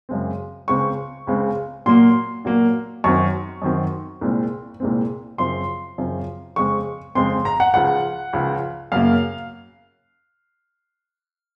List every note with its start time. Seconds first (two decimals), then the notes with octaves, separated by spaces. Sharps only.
0.09 F#2 C#3 G#3 C4
0.68 C#2 C#3 G#3 C4 C#6
1.27 C#2 C#3 G#3 C4
1.86 A#2 F#3 A#3 C6
2.45 A#2 F#3 A#3
3.04 F#2 D#3 F#3 C4 C#6
3.62 F#2 D#3 F#3 C4
4.21 C2 A#2 G#3 C4
4.80 C2 A#2 G#3 C4
5.38 F#2 C#3 F3 C4 C6
5.98 F#2 C#3 F3 C4
6.56 F2 C#3 G#3 C4 C#6
7.15 F2 C#3 G#3 C4 C6
7.45 A#5
7.60 F#5
7.74 C#2 C#3 F3 F#5
8.33 C#2 C#3 F3
8.92 F#2 C#3 F#3 A#3 F5